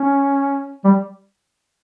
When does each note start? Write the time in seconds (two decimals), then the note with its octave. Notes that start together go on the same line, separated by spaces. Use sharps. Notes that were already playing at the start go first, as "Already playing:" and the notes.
Already playing: C#4
0.85 G3